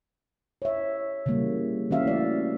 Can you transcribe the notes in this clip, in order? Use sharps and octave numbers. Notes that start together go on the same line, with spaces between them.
C#5 E5
C#3 E3 G3 A#3
E3 C#4 F#4 E5 F5
A3 D5